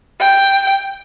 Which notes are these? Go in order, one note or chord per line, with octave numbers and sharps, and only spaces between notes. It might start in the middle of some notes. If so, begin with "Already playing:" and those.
G5